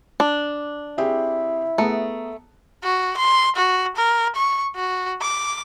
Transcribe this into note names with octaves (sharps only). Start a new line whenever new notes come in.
D4
C4 E4 G4 G#4
A3 B3 G#4 A#5
F#4
C6
F#4
A#4
C#6
F#4
D6